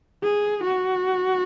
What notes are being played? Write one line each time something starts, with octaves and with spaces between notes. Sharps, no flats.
G#4
F#4